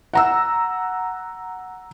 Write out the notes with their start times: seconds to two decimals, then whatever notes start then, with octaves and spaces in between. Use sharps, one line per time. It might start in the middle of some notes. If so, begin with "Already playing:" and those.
0.13 F#5 A#5 E6